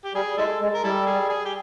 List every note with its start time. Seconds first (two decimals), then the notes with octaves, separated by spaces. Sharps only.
0.05 G4
0.14 G3 G#4
0.37 G#3 E4 A4
0.61 G#3
0.74 A#4
0.84 G3 E4 A4
1.06 G#4
1.29 G#4
1.45 G4